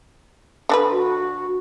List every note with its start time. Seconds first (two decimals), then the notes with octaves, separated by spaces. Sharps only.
0.69 D3 D4 B4
0.92 F#4